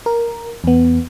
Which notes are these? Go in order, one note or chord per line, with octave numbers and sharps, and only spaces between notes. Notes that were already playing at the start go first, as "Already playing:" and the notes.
A#4
E2 B3